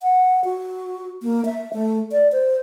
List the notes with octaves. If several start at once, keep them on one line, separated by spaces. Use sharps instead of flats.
F#5
F#4
A#3
E5
A3
D5
C5